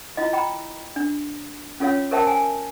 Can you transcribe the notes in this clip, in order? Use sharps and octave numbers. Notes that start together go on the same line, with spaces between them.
E4 F4 D#5
G5 A#5 B5
D4
C#4 F4 A4 C#5 F5
A4 A#4 C5 E5 G5 A5
G#5